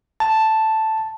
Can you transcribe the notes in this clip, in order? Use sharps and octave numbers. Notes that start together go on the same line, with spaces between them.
A5